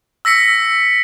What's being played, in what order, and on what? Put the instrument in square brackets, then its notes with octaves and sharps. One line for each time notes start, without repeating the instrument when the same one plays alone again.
[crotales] E6 A#6 B6 C#7